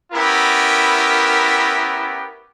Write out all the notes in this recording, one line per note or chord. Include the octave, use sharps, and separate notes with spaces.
B3 C#4 E4 G4 A#4